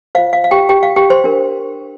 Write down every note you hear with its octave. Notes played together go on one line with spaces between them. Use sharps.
F4 C5 F5
F5
F5
G4 G5
G4 G5
F5
G4 G5
C5 C6
D4 A#4